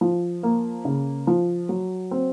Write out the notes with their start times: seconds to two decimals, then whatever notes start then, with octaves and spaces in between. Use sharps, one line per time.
0.01 F3
0.43 A#3
0.85 C#3
1.27 F3
1.69 F#3
2.11 C4